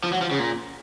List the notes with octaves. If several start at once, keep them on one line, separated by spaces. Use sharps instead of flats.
F3
F#3
F3
C#3
A#2